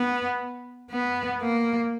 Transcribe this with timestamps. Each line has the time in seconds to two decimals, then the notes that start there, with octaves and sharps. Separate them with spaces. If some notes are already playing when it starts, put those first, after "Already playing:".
Already playing: B3
0.91 B3
1.41 A#3